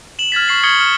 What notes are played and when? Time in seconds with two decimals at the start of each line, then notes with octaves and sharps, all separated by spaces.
0.19 E7 F#7
0.32 F6 G#6 A6 B6
0.48 C#6 C7 F#7
0.63 C#6 D#6 G#6 C#7 G7
0.80 F6